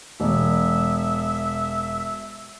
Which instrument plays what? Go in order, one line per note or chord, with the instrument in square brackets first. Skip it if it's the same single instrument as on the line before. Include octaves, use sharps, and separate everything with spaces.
[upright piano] E1 [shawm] E5